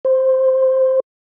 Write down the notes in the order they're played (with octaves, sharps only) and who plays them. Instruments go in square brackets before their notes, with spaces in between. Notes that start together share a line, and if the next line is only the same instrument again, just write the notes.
[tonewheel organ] C5